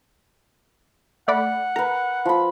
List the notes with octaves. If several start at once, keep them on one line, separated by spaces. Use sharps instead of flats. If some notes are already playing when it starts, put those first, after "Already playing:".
A3 D5 F#5 B5
A#4 B4 A#5
F3 B5